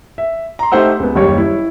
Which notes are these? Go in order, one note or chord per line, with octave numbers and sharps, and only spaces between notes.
E5
A#5 C6
A3 D#4 G4 C5 F#5 E6
C#2 B3
F#1 D#2 G3 C#5 C#6
E4